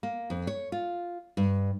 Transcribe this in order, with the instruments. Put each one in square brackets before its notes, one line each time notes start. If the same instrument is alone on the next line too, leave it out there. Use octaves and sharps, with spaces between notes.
[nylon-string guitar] A#3
F2
C#5
F4
G2